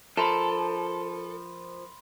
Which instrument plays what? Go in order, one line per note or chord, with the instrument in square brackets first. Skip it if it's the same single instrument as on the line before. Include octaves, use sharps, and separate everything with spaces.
[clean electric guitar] F3 A#4 [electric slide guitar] A4 [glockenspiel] B5 C6 E7